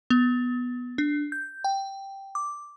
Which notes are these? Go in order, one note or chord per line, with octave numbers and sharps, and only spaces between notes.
B3
D4
G6
G5
D6